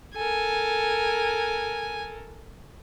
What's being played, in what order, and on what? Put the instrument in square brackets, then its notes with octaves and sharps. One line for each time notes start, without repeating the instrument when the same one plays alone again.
[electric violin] A4 A#4 [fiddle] G#5